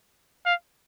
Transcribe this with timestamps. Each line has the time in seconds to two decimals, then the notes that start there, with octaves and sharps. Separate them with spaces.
0.46 F5